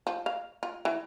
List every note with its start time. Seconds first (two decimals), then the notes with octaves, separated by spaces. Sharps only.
0.07 F3
0.26 F5
0.63 F4
0.85 E3